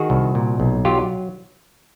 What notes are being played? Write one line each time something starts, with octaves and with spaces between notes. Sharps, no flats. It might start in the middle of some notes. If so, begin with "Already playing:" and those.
Already playing: D#3 F#4 G#4
C2
A#2
B1
F#3 F4 G4